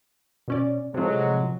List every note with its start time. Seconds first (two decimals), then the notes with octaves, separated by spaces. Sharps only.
0.48 B2 C#4 D5
0.94 A2 C3 F3 F#3 G#3